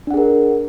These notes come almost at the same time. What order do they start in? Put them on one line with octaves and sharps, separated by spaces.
D4 F#5 G#4 A#4